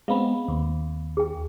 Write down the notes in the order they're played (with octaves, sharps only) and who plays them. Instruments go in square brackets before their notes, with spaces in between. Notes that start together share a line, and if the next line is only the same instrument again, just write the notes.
[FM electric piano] G#3 B3 C4 [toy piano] F5 B5
[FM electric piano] D#2
[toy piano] G#4 G5